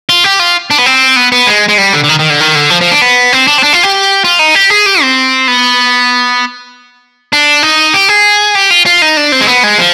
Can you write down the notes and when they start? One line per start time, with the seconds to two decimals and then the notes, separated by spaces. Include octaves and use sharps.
0.09 F4
0.24 G4
0.40 F4
0.70 D4
0.78 B3
0.86 C4
1.16 B3
1.32 B3
1.47 G#3
1.68 G#3
1.78 G3
1.93 D3
2.04 D3
2.09 D#3
2.19 D#3
2.30 D3
2.40 D#3
2.55 D3
2.70 F3
2.81 F3
2.91 D4
3.01 B3
3.33 C4
3.47 D4
3.58 C4
3.63 D4
3.73 F4
3.83 G4
4.24 F4
4.39 D#4
4.55 G4
4.70 G#4
4.86 G4
5.02 C4
5.48 B3
7.33 D4
7.63 D#4
7.94 G4
8.09 G#4
8.55 G4
8.71 F4
8.86 F4
9.02 D#4
9.17 D4
9.32 C4
9.41 G#3
9.48 B3
9.63 G#3
9.78 F3